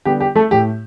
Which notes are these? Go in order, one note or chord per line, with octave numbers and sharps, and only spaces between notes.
D3 G3 B3 G4
G4
A3 A4
A2 A3 G4